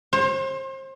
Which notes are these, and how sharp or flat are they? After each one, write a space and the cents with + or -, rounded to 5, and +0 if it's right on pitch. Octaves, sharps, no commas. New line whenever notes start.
C5 +35